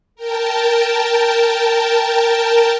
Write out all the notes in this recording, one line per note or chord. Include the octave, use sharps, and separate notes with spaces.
A#4 G5 A5